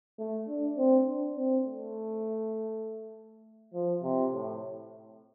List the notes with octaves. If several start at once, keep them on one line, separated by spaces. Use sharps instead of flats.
A3
D4
C4
D4
C4
A3
F3
C3
A2